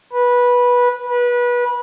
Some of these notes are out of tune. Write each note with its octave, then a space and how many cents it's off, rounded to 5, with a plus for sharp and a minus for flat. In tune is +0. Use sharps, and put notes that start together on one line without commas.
B4 -15
B4 -25